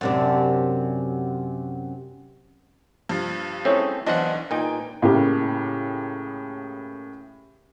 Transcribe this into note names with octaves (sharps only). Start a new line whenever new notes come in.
F#2 C3 D4
G2 F3
A3 C4 C#4 E4 G#4 C#5
B1 E3 D4 C5 D#5 F5 F#5
A#2 D#4 G#4 B4 G5 G#5
A2 C#3 A#3 G4